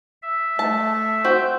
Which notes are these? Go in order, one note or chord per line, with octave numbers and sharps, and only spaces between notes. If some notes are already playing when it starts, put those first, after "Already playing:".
E5
A3 A5
C4 F#4 G6